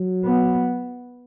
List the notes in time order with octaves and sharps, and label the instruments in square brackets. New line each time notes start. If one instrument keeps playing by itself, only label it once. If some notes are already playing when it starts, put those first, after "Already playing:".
Already playing: [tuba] F#3
[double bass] B3